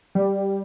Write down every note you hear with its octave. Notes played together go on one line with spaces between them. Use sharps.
G3